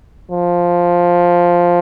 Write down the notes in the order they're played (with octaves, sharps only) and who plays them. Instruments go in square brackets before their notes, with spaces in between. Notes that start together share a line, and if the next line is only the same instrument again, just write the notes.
[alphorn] F3